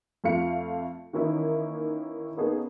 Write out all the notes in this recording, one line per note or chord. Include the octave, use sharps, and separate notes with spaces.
F2 A3 F4 F5 C#7
D#3 E3 A#3 C#4 D#4 E4
A#3 B3 C#4 D#4 G#4 A4